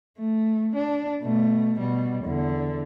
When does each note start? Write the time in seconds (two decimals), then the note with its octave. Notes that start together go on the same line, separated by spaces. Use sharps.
0.19 A3
0.76 D4
1.23 B2 A3
1.79 B2 G3
2.24 E2 D3